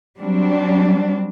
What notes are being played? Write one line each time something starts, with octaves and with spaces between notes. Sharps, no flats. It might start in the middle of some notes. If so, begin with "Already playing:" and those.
F#3 G3 C4 D4